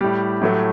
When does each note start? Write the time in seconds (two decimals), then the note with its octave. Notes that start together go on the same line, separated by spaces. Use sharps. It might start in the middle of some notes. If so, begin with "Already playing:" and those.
0.01 A2 G3 G4
0.42 A2 F#3 A3